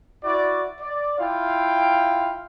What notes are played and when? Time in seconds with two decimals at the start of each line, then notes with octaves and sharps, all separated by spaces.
0.24 E4 F#4 D5
0.81 D5
1.19 E4 F4 F5 G5